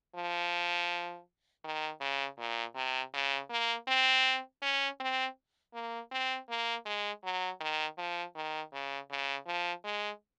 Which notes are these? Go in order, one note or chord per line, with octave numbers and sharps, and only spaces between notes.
F3
D#3
C#3
A#2
C3
C#3
A#3
C4
C#4
C4
A#3
C4
A#3
G#3
F#3
D#3
F3
D#3
C#3
C#3
F3
G#3